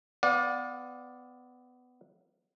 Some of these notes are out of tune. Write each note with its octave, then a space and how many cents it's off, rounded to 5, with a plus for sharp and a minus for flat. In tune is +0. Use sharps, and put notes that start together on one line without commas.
B3 +20 D5 +0 F5 +45